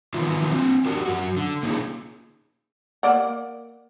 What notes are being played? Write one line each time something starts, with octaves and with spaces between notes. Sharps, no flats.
D#3 E3 F#3 B3 E4 F4
C4 D4
D4 F#4 G4 A#4
F#2 F#4
D3
A3 A#3 C#4 D#4 F4 G#4
A#3 D5 F#5